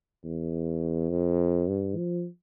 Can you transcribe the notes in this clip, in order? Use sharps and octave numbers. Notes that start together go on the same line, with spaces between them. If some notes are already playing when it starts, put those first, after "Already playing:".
E2
F2
G2
F3